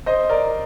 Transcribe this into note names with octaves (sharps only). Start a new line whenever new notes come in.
C5 D#5
A#4 D5